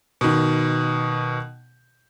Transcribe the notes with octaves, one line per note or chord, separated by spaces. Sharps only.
B2 D#3